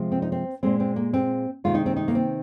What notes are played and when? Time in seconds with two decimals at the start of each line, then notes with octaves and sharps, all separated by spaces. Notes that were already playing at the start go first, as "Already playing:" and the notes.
Already playing: C3 F3 G#3
0.12 C4
0.22 D#4
0.32 C4
0.63 A#2 G#3 C4
0.80 C4
0.96 A#3
1.14 C4
1.64 C3 D#3 G#3 F4
1.74 D#4
1.86 C4
1.96 D#4
2.08 A#3
2.15 C4